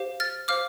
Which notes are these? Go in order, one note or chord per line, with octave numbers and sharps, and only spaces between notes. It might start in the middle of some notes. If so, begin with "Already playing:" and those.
Already playing: G4 C5 F5
F6 A6
C5 F5 D6 F6